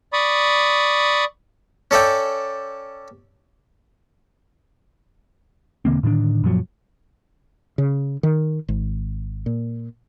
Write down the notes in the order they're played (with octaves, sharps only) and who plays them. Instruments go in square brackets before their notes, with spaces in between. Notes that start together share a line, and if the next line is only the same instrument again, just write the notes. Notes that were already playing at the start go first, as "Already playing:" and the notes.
[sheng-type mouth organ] D5 B5 C#6 D#6
[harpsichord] C#4 A4 D5 E5 G5
[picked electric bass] E1 D3 A#3 C4
A2 D3 D#3 D4
F#2 A#2 F3 F#3
[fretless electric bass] C#3
D#3
G#1
A#2